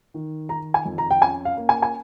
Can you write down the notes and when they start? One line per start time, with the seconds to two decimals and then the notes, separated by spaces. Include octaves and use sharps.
0.14 D#3
0.49 D#3 A#5
0.74 G#5
0.85 F2
0.98 A#5
1.11 G5
1.22 C#4 G#5
1.45 F5
1.57 A#3
1.69 G#5
1.83 G#5